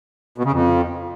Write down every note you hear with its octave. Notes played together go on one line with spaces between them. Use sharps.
B2
C#3
F2